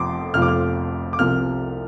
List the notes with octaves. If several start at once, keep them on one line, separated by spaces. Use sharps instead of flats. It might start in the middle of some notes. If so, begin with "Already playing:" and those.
Already playing: F1 F2 F3 C6 D6
F1 F2 F3 F6
D6
F6
D6
C2 C3 F3 F6